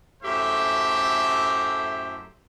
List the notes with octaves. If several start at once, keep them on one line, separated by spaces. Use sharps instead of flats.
F#2 A2 A3 G4 C5 E5